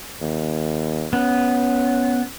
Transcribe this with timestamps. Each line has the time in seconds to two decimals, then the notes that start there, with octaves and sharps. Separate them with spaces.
0.22 D#2
1.13 B3 C#4